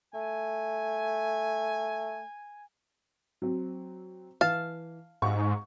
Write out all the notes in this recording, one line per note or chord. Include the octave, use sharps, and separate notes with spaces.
A3 G#5
F#3 C4
E3 F5 A5
G#2 F5 F#5 C#6